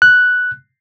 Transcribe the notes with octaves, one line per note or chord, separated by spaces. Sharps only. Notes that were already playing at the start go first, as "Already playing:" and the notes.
F#6